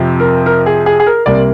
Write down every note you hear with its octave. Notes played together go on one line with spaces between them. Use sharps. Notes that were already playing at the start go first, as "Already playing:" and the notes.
Already playing: F2 C3 F3
A#4
A#4
G#4
G#4
G#4
A#4
C2 C3 G3 A#3 D5